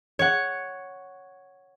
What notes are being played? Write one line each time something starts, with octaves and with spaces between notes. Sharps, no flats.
C#5 F#5